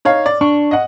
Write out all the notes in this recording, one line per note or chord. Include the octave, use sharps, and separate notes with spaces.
D#4 C#5 F5
D5
D4 C#6
D#5 F#5